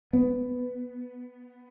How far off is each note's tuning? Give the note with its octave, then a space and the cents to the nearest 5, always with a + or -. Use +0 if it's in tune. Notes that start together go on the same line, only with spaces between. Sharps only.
B3 +10